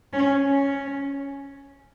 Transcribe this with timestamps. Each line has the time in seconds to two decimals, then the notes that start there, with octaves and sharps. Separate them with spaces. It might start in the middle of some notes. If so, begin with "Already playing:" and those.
0.13 C#4
0.47 C#4